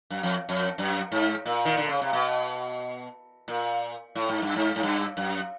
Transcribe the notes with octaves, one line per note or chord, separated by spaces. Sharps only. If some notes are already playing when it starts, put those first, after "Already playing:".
F#2
F2
F2
F#2
G#2
A#2
D#3
D3
C#3
C3
B2
A#2
A2
G#2
G2
G#2
G#2
G2
F#2